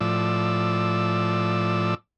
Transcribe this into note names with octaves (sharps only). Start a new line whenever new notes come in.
A2 F3 D5 E6